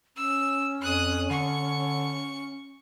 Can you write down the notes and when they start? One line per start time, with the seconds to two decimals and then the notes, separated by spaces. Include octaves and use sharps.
0.16 C#4 E6
0.81 F2 D#6 F#6
1.30 D3 C#6